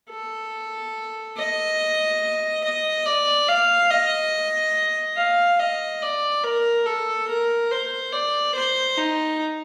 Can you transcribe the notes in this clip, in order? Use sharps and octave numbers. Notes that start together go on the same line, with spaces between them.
A4
D#5
D#5
D5
F5
D#5
F5
D#5
D5
A#4
A4
A#4
C5
D5
C5
D#4